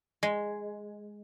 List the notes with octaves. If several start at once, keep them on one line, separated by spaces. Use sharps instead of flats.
G#3